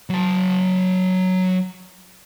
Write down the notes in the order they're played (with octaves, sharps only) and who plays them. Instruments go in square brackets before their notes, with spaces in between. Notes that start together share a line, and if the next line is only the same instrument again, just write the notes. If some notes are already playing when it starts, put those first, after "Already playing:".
[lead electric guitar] F#3 A5